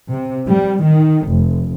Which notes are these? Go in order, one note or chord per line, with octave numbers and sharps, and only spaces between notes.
C3
G3
D#3
F1